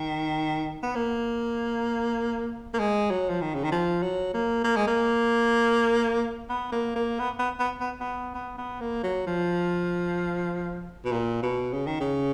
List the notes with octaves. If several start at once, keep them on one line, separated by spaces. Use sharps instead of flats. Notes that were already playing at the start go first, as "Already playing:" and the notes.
Already playing: D#3
B3
A#3
A#3
G#3
F#3
F3
D#3
C#3
D#3
F3
F#3
A#3
A#3
G#3
A#3
B3
A#3
A#3
B3
B3
B3
B3
B3
B3
B3
A#3
F#3
F3
B2
A#2
B2
C#3
D#3
C#3